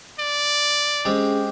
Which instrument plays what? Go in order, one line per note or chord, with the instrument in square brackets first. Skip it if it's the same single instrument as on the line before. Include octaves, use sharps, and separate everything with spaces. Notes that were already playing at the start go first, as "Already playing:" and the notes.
[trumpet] D5
[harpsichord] G#3 C4 G4 [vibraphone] C#4 G#4